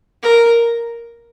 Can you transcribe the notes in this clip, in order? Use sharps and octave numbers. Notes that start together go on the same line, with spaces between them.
A#4